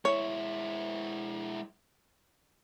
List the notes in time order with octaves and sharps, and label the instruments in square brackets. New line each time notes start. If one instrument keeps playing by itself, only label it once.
[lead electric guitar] G#3 E4 [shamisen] C#5